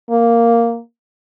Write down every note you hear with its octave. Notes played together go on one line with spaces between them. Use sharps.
A#3